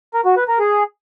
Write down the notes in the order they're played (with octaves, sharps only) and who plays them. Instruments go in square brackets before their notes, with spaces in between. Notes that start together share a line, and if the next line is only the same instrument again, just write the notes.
[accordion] A#4
F#4
B4
A#4
G#4